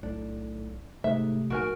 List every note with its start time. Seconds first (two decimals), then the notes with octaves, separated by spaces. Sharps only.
0.03 B1 A2 D4
1.04 G#2 C3 A3 E5
1.50 A#1 G#2 F#4 A#4 G#5 D7